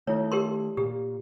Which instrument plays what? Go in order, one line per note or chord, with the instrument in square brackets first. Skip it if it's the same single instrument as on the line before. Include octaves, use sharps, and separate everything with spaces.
[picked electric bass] D#3 A3 [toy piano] E4 C#5
[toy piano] G4 A#4 C6
[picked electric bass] A#2 [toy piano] G4